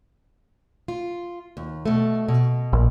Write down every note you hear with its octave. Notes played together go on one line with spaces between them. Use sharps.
F4
D#2
B2 A3
B2
A#1